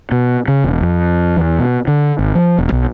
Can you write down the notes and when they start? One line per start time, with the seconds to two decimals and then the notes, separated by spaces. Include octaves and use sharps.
0.12 B2
0.48 C#3
0.64 E1
0.81 F2
1.37 E2
1.59 B2
1.88 D3
2.19 G#1
2.35 F3
2.58 E1
2.72 B1